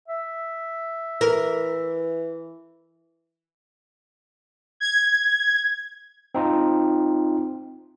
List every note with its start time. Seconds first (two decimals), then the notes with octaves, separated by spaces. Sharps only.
0.08 E5
1.21 E3 A#4
4.80 G#6
6.35 C4 D#4 F4